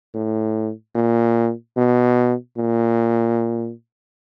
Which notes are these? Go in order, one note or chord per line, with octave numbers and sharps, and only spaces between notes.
A2
A#2
B2
A#2